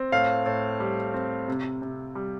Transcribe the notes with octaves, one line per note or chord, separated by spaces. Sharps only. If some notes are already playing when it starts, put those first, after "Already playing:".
Already playing: C4
A2 F5
A2
G3
C4
C3
C3
G3